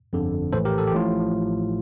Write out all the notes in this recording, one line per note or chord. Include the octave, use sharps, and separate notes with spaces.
G1 F2 D3
A#1 A2 E3 A4 C5
G4 A#4
A4
G4
A1 A2 F3 F4